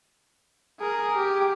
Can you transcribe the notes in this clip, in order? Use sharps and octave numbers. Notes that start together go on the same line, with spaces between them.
G#4 A#4
G4